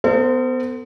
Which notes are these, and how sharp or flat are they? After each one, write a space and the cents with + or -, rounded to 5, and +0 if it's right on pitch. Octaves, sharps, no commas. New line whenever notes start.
B3 +20 A4 +45 C5 -20